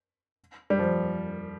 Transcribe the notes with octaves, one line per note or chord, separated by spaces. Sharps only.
G3
F3